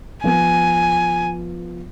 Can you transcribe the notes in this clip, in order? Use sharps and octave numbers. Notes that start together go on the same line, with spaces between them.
F3 B3 G#5